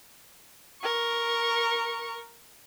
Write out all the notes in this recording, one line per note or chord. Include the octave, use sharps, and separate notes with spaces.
A#4 C#6